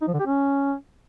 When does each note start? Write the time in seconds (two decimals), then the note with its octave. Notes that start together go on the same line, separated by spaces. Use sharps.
0.02 D#4
0.08 F3
0.14 D3
0.20 G4
0.26 C#4